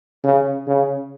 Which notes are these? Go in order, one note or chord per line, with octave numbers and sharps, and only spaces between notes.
C#3
C#3